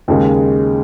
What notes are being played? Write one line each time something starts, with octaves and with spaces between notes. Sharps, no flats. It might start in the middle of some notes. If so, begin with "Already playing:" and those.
D#2 C#3 G#3